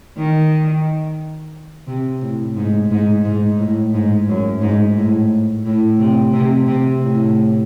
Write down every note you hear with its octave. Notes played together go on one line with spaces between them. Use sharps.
D#3
C3
A2
G#2
G#2
G#2
A2
G#2
F#2
G#2
A2
A2
C3
C3
C3
A2